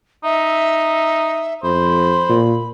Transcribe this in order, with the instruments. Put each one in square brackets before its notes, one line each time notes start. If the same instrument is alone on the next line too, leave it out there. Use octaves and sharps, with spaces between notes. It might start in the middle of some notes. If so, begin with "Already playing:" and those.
[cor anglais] D#4 [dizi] E5
[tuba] F2 [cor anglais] C5 [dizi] B5
[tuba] A#2